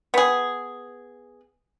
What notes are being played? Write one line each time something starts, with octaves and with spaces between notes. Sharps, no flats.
B3 G#4